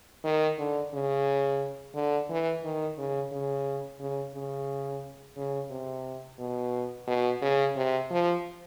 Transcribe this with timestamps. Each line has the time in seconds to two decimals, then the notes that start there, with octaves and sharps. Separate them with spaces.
0.24 D#3
0.58 D3
0.93 C#3
1.95 D3
2.30 E3
2.64 D#3
2.98 C#3
3.32 C#3
4.00 C#3
4.34 C#3
5.37 C#3
5.70 C3
6.38 B2
7.07 B2
7.42 C#3
7.76 C3
8.10 F3